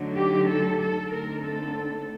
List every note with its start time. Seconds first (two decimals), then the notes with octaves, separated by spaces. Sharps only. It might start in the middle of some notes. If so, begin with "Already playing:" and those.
Already playing: D3 F#3 A3 D#4
0.14 G4
0.47 A4
0.78 A4
1.10 D3 A3 C4 D#4 A#4
1.42 A4